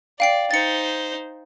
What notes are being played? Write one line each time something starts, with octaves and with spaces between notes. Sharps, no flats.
D5 F5 G5 C7
D#4 C5 A6 C#7